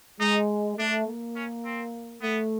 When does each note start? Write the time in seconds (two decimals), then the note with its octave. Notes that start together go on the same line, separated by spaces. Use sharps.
0.20 G#3 D#4
0.78 A3 D4
1.07 A#3
1.36 C#4
1.65 C4
2.22 A3 B3